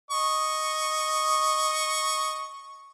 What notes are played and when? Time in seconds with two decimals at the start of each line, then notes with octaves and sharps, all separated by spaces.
0.11 D#5 C#6